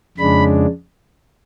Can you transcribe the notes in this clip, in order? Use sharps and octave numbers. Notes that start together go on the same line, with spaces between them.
F2 C#3 G#3 D4 B5